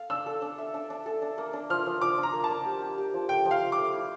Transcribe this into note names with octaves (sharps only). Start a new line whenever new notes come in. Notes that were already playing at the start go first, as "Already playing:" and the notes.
Already playing: A4 F5
D4 E6
A4
D4
E5
D4
D4
A4
D4
A#3
D4
F3 F6
F3
F3 D6
D4
A#5
A#3
A5
A#3
G4
G4
G4
F3
A3 G5
F3
F5
G4
D6
A3
E4